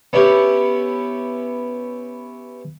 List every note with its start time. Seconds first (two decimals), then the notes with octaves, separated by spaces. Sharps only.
0.13 B3 C#4 E4 G4 C#5